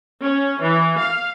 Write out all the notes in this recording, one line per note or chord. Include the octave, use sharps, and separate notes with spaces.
C#4
E3
F5